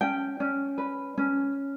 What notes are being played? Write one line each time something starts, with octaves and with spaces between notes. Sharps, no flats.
C#4 G5
C#4
B4
C#4